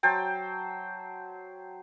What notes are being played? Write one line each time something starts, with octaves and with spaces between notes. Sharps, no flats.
F#3 C5 G5 A5